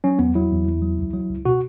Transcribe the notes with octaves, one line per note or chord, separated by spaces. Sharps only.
F#3 C#4
E2 B3
F#3 E4
E2
E2
F#3
C#2
F#3
C#2
B2 F#4